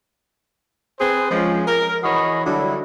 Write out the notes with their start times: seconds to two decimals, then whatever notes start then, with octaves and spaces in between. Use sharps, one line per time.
1.00 C4 G#4 B4 C5
1.30 F3 G#3 C#4
1.67 A#4
2.03 E3 F#4 G#4 C#5 D#5 B5
2.44 D3 F#3 G3 D4 E4